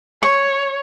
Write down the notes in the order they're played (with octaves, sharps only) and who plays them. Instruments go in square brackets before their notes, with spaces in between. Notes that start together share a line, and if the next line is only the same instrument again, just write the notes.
[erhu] C#5 [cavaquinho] C#6